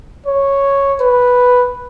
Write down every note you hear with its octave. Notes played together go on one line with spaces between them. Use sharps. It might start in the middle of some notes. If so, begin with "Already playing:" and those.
C#5
B4